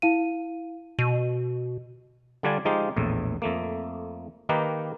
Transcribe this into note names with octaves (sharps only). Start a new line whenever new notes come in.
E4 F5 D#7
B2 D#7
D3 G3 D4 F4 D5 G#5
F3 G#3 D#4 F4 G4
A#1 E2 A2
F2 A3 A#3
D#3 A#3 D#4 G4 A#4 B4